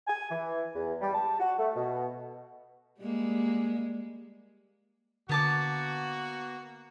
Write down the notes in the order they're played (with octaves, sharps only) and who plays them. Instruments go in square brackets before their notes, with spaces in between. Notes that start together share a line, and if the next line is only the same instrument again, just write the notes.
[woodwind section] G#5
E3
E2
G3
A5
F#4
A3
B2
[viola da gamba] G3 G#3 A#3
[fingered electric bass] D3 [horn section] A#3 F#4 [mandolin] B3 A5 D6